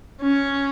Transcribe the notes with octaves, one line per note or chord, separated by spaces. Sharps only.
C#4